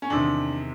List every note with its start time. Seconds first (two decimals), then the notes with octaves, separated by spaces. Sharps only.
0.02 C#4
0.10 E2 C3 D#3 D4